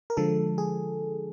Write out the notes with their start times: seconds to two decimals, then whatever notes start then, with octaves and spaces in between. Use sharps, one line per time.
0.10 A#4
0.17 D3 F3 G#3 A4
0.58 G#4